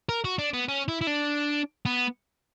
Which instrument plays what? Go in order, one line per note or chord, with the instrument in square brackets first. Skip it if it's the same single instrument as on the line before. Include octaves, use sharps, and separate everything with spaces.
[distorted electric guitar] A#4
F#4
D4
B3
C#4
E4
E4
D4
B3